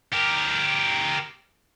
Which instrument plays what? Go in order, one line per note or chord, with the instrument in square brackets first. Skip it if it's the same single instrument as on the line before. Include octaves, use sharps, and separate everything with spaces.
[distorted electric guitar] G4 A#4